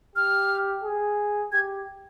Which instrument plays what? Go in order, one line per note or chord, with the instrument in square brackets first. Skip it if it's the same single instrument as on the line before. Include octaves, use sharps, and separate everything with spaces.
[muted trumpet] G4 [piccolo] F6
[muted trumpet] G#4
[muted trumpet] G4 [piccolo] G#6